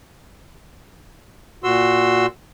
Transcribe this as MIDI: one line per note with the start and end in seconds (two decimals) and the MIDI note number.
1.64 2.26 46
1.64 2.26 66
1.64 2.26 84
1.64 2.26 88